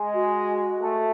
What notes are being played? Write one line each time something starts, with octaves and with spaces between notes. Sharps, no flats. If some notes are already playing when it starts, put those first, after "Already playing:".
Already playing: G#3
F#4
A3